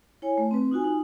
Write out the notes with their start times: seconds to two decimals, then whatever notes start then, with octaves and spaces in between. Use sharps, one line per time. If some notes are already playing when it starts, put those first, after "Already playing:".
0.22 E4 C#5 G#5
0.38 A3
0.51 C4 B4
0.71 D#4 F4 F#4 G#5
0.84 D#4